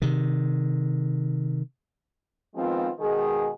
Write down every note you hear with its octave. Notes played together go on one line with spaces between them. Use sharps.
C3 D#3
D#3 F3 G#3 B3 C4 F4
B2 D#3 G#3 G#4